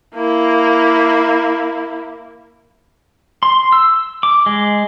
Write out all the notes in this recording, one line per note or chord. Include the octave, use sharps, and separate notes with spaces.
A#3 E4
C6
E6
D6
G#3